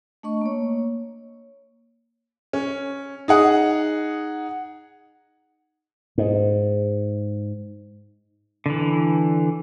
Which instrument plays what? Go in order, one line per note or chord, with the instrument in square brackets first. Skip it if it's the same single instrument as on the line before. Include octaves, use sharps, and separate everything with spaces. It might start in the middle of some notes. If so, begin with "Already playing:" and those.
[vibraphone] A3 D4 D#5 C#6
A#3 C#5
[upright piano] C#4
D#4 G#4 F#5
[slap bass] G#2
[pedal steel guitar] D3 E3